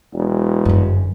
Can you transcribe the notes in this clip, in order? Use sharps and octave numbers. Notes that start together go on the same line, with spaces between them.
E1
G1 F#2